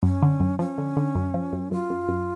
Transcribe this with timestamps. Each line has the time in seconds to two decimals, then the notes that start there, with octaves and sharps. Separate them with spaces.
0.03 F#2 C#4
0.22 D3
0.40 F#2
0.59 F3 C#4
0.78 D3
0.97 D3
1.15 F#2
1.34 F3
1.53 F#2
1.71 F#2 F4
1.90 F#2
2.08 F#2